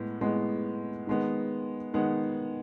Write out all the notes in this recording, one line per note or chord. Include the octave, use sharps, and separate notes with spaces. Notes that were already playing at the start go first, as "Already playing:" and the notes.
Already playing: A2 G#3 B3
A2 G#3 B3
D#3 G#3 B3
D#3 G#3 B3 F#5